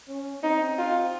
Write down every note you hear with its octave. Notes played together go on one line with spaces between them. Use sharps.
C#4
C4 D#4
F4